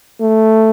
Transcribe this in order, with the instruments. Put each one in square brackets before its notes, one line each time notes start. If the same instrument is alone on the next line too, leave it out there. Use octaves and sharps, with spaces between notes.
[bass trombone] A3